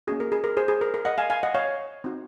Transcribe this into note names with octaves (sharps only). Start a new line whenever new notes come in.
A#3 C#4 F#4 G#4
A#4
G#4
A#4
G#4 C5
G#4
A#4
A#4
D#5 F#5
F5 G#5
F5 G#5
D#5 F#5
C#5 F5
C4 D#4 F#4